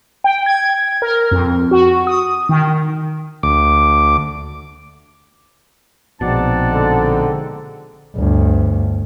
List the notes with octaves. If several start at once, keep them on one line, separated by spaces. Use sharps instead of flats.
G5
G#6
A#4
F2
F#4
D#6
D#3
D2 D6
A#1 B2 G#3 C4 D#4 D5 F#5 A5
D3
G1 D2